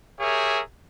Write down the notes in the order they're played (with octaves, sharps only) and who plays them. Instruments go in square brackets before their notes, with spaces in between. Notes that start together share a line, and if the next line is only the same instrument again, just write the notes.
[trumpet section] G4 G#4 A#4 C#5 E5